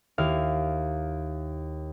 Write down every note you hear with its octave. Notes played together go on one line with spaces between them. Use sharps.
D#2 E4 F5 F6